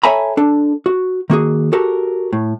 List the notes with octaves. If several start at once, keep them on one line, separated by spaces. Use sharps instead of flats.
A4 C#5 E5 G#5 A#5 B5
D4 A4
F#4
D#3 A#3 F#4 G#4
F#4 G4 A4 A#4
A2